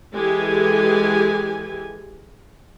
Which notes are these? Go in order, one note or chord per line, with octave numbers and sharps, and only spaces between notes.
E3 G#3 G4 A4 G#5